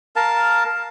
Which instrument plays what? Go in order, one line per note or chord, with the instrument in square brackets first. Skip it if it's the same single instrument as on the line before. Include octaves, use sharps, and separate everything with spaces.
[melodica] A#4 F5 A5